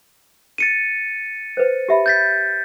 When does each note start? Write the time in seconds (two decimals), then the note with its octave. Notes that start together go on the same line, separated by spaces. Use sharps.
0.58 A6 C#7 D#7
1.57 B4 C5
1.89 G4 E5 B5
2.06 G6 A6 B6